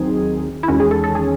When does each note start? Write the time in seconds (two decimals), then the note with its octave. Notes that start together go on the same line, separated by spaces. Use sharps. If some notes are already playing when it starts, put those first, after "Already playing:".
Already playing: D#2 D#3 F#3 C4 D#4 G#4
0.63 E4
0.68 E2 D#3 G#3 C#4 F#4
0.80 G#4
0.91 A4
1.04 A4
1.15 G#4